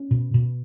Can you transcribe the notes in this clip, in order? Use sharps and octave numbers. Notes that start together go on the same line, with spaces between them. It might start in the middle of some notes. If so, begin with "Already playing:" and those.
Already playing: C#4
B2
B2